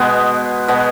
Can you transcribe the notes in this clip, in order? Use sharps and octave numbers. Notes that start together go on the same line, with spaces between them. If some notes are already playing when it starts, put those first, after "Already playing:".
Already playing: B2 G#3 B3
B2 G#3 B3